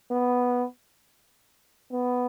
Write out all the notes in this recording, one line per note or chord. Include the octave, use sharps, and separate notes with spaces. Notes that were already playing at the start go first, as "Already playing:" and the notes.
B3
B3